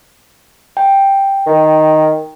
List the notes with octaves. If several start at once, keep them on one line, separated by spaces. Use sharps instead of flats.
G5
D#3